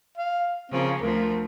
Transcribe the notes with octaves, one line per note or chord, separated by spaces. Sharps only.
F5
C#3 F3 A#3 C4
D2 F3 A#4